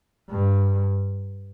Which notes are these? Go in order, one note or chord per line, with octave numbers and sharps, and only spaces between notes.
G2